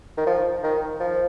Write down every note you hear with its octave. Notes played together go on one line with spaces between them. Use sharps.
D#3
F3
D#3
F3